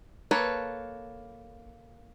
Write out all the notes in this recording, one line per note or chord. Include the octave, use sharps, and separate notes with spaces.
A#3 A4 B4 C#5